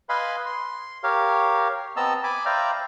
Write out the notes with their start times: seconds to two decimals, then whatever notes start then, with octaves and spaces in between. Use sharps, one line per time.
0.09 B4 D#5 F5 G#5 B5 C6
0.46 C6
1.03 G4 A#4 C#5 F5
1.97 B3 C4 D#5 A5 A#5 E6
2.24 G#5 B5 D6
2.45 C5 D5 E5 F5 G5 A#5